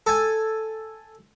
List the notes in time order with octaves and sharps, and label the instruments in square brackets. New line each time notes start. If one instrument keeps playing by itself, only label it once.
[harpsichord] A4 G#5